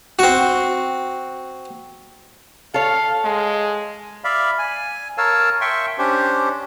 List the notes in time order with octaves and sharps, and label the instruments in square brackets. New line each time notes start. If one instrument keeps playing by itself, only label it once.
[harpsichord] C4 F#4
[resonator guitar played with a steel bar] A4 C#5 [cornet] F5
[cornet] G#3
[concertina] D5 E5 F5 B5
G#5
A#4 C#5 F5 A5 E6
E5 G5 C6 C#6
C#4 D4 G4 C5